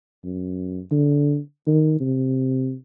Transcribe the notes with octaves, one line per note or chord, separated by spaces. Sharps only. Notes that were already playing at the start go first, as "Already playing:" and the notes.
F#2
D3
D#3
C3